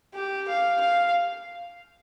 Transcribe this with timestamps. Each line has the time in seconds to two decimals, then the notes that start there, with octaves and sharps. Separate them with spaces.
0.14 G4
0.48 F5
0.81 F5